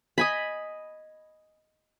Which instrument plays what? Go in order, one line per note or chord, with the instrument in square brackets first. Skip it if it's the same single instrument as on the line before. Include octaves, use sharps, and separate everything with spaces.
[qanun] D#5 G#5 B5